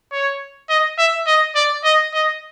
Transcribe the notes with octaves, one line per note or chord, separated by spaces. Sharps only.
C#5
D#5
E5
D#5
D5
D#5
D#5